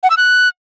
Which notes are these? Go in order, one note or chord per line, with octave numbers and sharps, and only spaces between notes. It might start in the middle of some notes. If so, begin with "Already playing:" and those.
F#5
E6
F#6